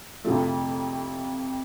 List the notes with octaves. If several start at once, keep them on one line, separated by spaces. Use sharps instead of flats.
F2 C3 F3 A3